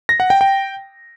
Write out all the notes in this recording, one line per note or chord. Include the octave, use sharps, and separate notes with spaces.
A#6
F#5
G5
G5